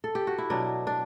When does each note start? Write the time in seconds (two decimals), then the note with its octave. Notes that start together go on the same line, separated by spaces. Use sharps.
0.04 A4
0.15 G4
0.27 F#4
0.38 E4
0.50 B2 F#3 D4
0.87 D4